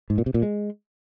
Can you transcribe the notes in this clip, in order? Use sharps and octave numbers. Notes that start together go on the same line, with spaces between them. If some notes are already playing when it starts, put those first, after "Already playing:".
G#2
A#2
C3
A#2
G#3